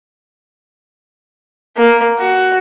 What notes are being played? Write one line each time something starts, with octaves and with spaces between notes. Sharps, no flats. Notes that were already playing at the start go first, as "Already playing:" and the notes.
A#3
F#4